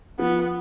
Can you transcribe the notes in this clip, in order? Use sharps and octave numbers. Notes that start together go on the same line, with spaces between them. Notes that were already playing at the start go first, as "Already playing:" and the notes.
F3 B3